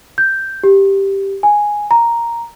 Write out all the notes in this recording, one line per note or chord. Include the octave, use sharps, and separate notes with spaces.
G6
G4
G#5
A#5